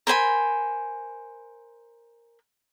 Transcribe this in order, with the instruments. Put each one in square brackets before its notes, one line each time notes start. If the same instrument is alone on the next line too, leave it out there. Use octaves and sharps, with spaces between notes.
[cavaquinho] A#4 C5 G#5 B5